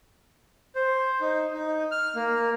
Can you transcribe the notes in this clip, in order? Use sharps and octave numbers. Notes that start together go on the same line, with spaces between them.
C5
D#4
D#4
F6
A#3